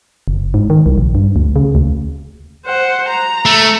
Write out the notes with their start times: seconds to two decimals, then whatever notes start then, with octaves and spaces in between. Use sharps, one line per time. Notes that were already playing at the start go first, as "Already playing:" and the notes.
0.28 F#1
0.54 G#2
0.70 D#3
0.86 C2
0.98 A#1
1.15 G2
1.36 D2
1.56 C#3
1.75 D2
2.66 C5 F#5
3.09 A#5
3.46 A3